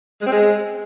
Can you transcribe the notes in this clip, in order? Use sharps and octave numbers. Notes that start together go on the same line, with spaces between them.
G#3
C4
G#3